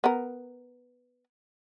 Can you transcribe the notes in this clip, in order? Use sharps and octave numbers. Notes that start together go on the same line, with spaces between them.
B3 A#4